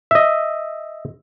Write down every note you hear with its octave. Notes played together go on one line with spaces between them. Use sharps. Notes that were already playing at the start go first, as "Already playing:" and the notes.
D#5 E5